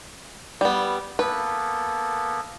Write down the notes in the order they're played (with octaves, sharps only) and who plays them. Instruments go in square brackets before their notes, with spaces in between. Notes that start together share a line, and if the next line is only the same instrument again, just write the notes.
[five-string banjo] G3 B3
[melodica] A#3 B3 A4 [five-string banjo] B4